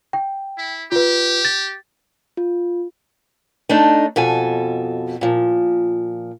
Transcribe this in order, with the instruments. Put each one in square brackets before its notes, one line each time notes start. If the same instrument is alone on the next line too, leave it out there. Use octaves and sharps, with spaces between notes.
[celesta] G5
[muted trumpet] E4
[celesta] F4 B4 [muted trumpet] G4
[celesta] A6
[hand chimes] F4
[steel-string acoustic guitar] A3 D4 D#4
F2 B2 A4 G#5
A#2 F3